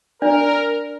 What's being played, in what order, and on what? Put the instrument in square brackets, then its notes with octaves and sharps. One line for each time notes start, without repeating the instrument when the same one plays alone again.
[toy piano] D4 D5 [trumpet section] A#4